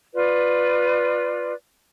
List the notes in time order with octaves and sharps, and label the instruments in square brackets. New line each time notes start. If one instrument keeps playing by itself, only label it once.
[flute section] F4 B4 D5